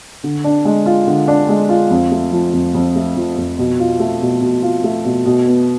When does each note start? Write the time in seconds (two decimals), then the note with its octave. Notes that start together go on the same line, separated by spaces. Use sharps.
0.24 D3
0.44 D4
0.65 G#3
0.86 F4
1.07 D3
1.28 D4
1.49 G#3
1.69 F4
1.90 F2
2.11 A3
2.32 F3
2.53 F2
2.75 F2
2.95 A3
3.16 F3
3.38 F2
3.58 B2
3.79 F4
4.00 A3
4.22 B2
4.41 B2
4.62 F4
4.84 A3
5.05 B2
5.26 B2
5.47 B3